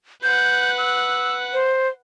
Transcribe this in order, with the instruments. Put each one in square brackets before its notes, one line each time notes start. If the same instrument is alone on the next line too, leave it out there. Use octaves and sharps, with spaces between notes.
[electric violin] B4 F#5 [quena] G6
[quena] E6
C5